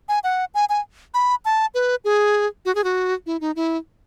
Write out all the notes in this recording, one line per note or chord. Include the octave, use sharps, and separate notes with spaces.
G#5
F#5
G#5
G#5
B5
A5
B4
G#4
F#4
G#4
F#4
E4
D#4
E4